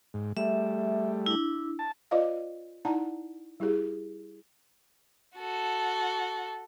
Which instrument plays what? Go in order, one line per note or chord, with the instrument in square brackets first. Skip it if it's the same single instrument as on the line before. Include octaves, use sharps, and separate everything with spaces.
[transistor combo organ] G#2
[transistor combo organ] G3 A3 [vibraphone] E5
[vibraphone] D4 E4
[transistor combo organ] A5
[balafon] F4 C5 D5 D#5 F5
D#4 E4 D5 F#5 A5 A#5
G3 E4 G4 G#4
[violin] F#4 A4